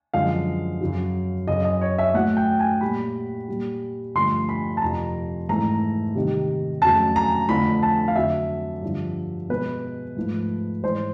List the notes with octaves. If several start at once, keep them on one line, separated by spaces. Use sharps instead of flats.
F#2 D3 F3 G#3 F5
F#2 C#3 F#3
F#2 C#3 F#3 D#5
D#5
C#5
E5
A2 F#3 A3 F#5
G5
G#5
A#2 G3 B5
A#2 G3
G2 D3 F3 A3 C6
B5
A5
F2 C3 F3 A#5
G#2 E3 A3 A#5
C3 D#3 G3
F2 C#3 F#3 A3 A5
A#5
F2 D3 F3 A3 B5
A5
F5
F2 D3 F#3 E5
G2 D3 F3
B2 G#3 B4
G#2 F3 A3
G#2 E3 G#3 C5